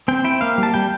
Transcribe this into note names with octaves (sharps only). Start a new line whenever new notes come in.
C4 G5
E4 G5
A#3 F5
G3
A5
G3 G5